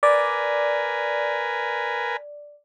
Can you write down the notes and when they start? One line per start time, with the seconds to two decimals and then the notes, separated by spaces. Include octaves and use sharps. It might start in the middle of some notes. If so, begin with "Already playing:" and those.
0.03 A#4 B4 D5 G#5